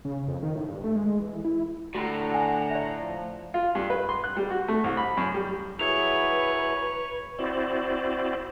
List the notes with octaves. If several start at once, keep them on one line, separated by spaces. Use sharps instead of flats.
C#3
F2
D#3
A2
G2
A3
G#3
E3
E4
A2 D3 F#4 F#5 A#5 B5
G#5
D5 E5
F3
F4
G2
B4
C6
F#6
G3
F#4
A3
C2
B5
F#2
G3
F#3 E4 G#4 B4 C#5 F7
C4 E4 F#4 C5 D5